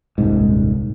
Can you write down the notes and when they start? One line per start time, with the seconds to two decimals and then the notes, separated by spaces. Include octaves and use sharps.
0.18 D#1 C2 G#2